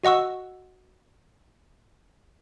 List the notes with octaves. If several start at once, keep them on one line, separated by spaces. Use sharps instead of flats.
F#4 D#5 F#5 C#6 E6